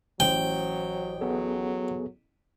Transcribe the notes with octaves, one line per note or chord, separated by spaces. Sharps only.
A1 F#3 C5 G5
F#3 B3 G#4 A4